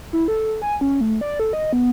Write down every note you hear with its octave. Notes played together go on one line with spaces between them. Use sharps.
E4
A4
G#5
C#4
A3
D5
A4
D#5
B3